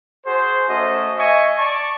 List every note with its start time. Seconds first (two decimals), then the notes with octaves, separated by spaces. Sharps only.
0.25 F#4 G#4 C5
0.68 A3 C#4 F#4 C5 D#5
1.17 D#5 E5 G#5 C#6
1.57 D5 A5 C#6